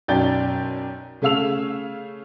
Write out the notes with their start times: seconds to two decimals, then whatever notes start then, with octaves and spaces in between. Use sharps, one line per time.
0.08 B1 F#2 D5 G5 G6 A6
1.22 C#3 A3 G#4 F5 E6 F7